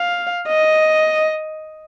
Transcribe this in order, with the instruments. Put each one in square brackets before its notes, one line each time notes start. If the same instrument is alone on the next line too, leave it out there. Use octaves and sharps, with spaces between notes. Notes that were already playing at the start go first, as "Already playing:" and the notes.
Already playing: [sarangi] F5
D#5